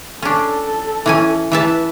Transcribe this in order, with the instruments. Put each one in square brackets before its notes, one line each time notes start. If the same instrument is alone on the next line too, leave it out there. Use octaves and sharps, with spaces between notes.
[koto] C#4 D4 [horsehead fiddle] A4
[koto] E3 C#4 G#5
[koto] E3 E5 A5 [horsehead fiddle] B4